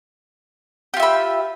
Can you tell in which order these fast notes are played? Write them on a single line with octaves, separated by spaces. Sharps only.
G4 F4 E5 B5